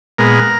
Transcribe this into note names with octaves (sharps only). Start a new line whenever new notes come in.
A#2 G#3 B3 A#4